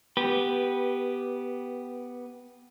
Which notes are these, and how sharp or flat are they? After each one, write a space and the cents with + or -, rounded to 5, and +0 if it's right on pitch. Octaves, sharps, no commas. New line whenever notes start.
B3 +0 G4 +0 B4 -15